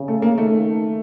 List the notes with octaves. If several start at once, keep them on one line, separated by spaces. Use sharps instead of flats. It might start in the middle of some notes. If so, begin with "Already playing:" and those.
Already playing: C#3
A3
A#3
D#3 A3